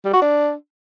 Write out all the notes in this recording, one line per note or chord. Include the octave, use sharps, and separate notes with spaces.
G3
F#4
D4